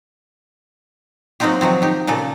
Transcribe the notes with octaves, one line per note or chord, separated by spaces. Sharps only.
F#3 A#3 C4 D#4 F4 G4
D#3 F3 F#3 C4
D#4 G4
A#2 C#3 A#3 A4